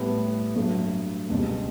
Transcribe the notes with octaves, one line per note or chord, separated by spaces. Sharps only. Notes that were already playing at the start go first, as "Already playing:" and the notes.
Already playing: A2 G3 B3
G2 F#3 A3
C#2 B2 G3